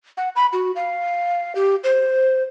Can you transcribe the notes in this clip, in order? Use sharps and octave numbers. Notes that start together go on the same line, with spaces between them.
F#5
B5
F#4
F5
G4
C5